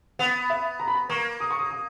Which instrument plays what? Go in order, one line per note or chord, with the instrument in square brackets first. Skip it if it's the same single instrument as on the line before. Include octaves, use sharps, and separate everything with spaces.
[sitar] B3 [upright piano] F#5
[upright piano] E5
A#5
B5
A#5
[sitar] A#3 [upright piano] C#6
[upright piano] D#6
C#6
D#6
D#6